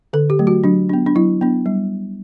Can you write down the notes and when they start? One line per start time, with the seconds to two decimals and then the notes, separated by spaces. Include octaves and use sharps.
0.13 D3 A4
0.30 G4
0.39 F#3 A3
0.47 F#4
0.64 F#3 D4
0.89 B3 D4
1.06 D4
1.15 F#3 E4
1.41 B3 D4
1.66 G3